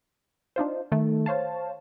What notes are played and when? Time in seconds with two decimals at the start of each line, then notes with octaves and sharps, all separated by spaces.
0.56 D4 D#4 F4 C5
0.92 D#3 A3
1.26 C5 C#5 F5 A5